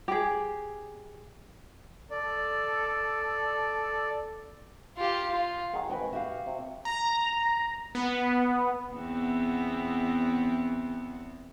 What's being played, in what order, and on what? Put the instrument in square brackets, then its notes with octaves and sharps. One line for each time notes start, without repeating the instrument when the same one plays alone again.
[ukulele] G4 G#4
[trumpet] A4 [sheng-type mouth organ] D5
[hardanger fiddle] F4 G4
F4
[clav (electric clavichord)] D#3 F#3 G#4 [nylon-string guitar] F#5
[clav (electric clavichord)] G#1 G5 G#5 [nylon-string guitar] F#4 B4
[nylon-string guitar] F#4 G4 F5 [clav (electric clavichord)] E5
[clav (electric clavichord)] C3
[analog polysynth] A#5
B3
[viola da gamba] E2 B3 C4